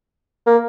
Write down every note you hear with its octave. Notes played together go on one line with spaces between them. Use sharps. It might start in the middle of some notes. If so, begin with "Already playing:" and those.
A#3